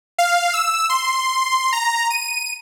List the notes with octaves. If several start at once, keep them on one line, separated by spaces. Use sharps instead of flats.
F5
E6
C6
A#5
D#7